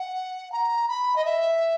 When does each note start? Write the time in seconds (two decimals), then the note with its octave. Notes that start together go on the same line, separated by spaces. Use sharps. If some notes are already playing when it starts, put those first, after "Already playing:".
Already playing: F#5
0.52 A#5
0.88 B5
1.16 D#5
1.25 E5